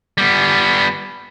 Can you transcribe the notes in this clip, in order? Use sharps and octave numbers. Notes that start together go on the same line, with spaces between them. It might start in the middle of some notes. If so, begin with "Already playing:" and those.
G3 B3